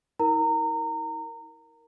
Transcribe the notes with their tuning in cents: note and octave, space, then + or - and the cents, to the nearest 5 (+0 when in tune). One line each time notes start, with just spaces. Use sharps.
E4 -45 A#4 +0 A#5 -25